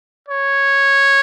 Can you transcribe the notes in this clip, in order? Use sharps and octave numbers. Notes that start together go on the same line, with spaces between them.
C#5